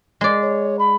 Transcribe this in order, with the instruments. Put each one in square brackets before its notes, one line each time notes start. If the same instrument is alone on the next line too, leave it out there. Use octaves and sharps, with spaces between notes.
[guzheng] G#3 D5
[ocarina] C#5
B5